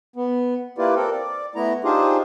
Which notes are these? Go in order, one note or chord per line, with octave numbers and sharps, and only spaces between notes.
B3
A#3 E4 F4 G4 B4 D5
C4 A4 A#4
D5
A3 B3 E4 A#5
D4 D#4 F4 G4 G#4 C5